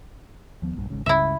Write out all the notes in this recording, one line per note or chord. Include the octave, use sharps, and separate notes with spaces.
D#2 F3 B3
A#1 G2
G#1 G#2 C#3
C#2 G2 C#3 E4 E5